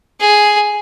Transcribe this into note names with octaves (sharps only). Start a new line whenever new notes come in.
G#4